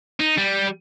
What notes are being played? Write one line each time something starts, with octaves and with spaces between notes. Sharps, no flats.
D#4
G3